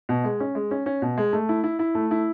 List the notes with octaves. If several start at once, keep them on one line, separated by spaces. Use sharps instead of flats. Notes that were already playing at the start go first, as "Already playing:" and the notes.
B2
G#3
C#4
G#3
C#4
C#4
B2
G#3
A3
E4
E4
E4
A3
E4